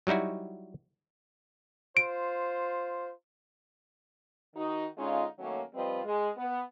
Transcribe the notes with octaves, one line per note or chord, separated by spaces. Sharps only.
F#3 G3 D#4 E4 F#4
F4 C5 D7
D#3 D#4 F#4
D3 G#3 C#4 D#4 F4
D#3 F#3 A3 A#3 C#4
F3 G3 C4 F4 B4 D#5
G#3
B3